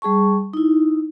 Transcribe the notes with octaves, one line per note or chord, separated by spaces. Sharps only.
G3 G#4 A5 C#6
D#4 E4